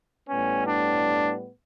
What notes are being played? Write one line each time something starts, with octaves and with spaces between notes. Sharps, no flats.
A2 G3 B3 C#4
D4